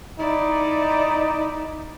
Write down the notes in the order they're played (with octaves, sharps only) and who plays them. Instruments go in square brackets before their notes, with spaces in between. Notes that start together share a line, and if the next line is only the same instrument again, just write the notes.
[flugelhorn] D#4 [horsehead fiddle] E4 D5